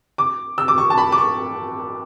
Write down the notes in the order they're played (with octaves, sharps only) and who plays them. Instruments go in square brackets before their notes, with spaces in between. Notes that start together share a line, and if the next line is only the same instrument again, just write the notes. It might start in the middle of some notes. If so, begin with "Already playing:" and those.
[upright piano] D6
E6
D6
C#6
A5
B5
D6
C#6